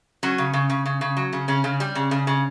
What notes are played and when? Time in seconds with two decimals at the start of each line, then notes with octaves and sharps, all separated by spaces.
0.23 F#3 C#4
0.38 C#3
0.53 C#3
0.70 C#3
0.86 C#3
1.01 C#3
1.17 F#3
1.33 C#3
1.48 C#3 C#4
1.64 C#3
1.80 G3
1.95 C#3
2.11 C#3
2.27 C#3